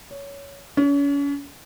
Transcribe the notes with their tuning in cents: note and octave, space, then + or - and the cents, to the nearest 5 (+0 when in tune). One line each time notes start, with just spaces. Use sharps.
C#5 +15
C#4 +35